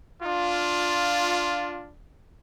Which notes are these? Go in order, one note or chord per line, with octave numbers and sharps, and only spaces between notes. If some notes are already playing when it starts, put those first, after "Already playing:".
D4 F4